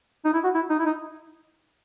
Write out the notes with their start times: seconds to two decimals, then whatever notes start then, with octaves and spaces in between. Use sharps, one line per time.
0.25 D#4
0.34 E4
0.44 F#4
0.55 E4
0.70 D#4
0.79 E4
0.85 D#4